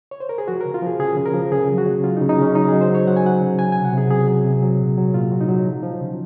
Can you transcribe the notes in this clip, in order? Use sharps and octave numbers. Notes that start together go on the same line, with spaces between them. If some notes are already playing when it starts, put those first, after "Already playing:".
C#5
C5
A#4
G#4
F3 F#4
C#3 A#4
F4
F3 G#4
C#3 G#4
C#3
A#4
F3
C#3 G#4
F#3
F#4
C#3
F#3 F4
D#4
C#3
D#4
C#3 C#4
F#3 D#4
F#3 G#4
C5
F#3 C#5
F#3 F#5
G#5
F#3 F#5
C#3
F#3 G#5
C3 G#5
F#5
C3 G#4
F#3 G#4
F#3
C3
F#3
A#2
F#3
A#2 F4
F#3
D#4
F#3
F3
F3
C#3